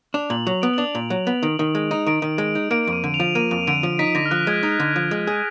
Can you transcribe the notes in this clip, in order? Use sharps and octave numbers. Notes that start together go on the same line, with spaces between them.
D4 F7
A#2 F#7
F#3 F7
B3 D7
F#7
D4 F7
A#2
F#3
B3
D#3 D7
D#3
G#3
D#4
D#3 D7
D#3
G#3
D#4
A#3 D7
F2 D7
D#7
D3
F7
F3
A#3 D#7
F2
D3 D7
F3
D#4 B6
D3 A#6
F6
F3 F#6
G#3 G#6
D#4
D3
F3
G#3
G#4